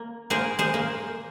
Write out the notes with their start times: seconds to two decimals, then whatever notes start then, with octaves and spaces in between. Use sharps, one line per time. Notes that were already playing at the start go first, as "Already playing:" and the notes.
Already playing: A#3
0.30 A#3 G#4 C5
0.59 G#4 C5
0.74 A#3